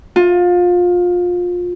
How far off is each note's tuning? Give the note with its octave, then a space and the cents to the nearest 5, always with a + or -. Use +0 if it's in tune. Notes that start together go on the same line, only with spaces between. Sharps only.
F4 +25